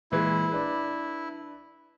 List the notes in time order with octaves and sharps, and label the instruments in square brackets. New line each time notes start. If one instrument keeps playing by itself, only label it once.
[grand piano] A#2 E3 G#3 [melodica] E4
[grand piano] D4 B4